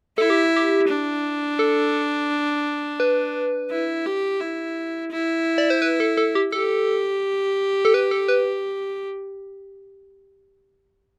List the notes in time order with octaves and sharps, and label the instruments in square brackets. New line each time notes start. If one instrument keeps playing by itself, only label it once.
[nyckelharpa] E4 [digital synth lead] A4
[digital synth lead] G4
G4
[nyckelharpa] D4
[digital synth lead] A4
B4
[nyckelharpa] E4
G4
E4
E4
[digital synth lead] D5
C5
B4
A4
A4
G4
[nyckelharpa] G4 [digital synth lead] A4
[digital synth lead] A4
B4
A4
B4